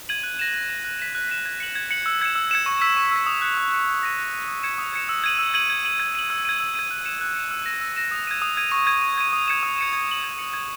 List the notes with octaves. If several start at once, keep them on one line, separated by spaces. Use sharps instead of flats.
G#6 D#7 F#7
F#6
A#6 E7
F#6
A#6 E7
F#6
B6 E7
F#6
B6 E7
G#6
C#7 F#7
G#6
C#7 F#7
E6
G#6 C#7 E7
E6
G#6 C#7 E7
C#6
E6 B6
C#6
E6 B6
D#6
F#6 C#7 E7
D#6
F#6 C#7 E7
F#6
A#6 D#7
F#6
A#6 D#7
D#6
G#6 C#7 E7
D#6
G#6 C#7 E7
E6
G#6 D#7 F#7
E6
G#6 D#7 F#7
G#6
D#7 F#7
G#6
D#7 F#7
E6
G#6 D#7
E6
G#6 D#7
F#6
C#7 E7
F#6
C#7 E7
E6
A#6 E7
E6
A#6 E7
D#6
G#6 D#7
D#6
G#6 D#7
C#6
G#6 D#7
C#6
G#6 D#7
D#6
G#6 C#7 E7
D#6
G#6 C#7 E7
G#6
C#7 F#7
G#6
C#7 F#7
G#6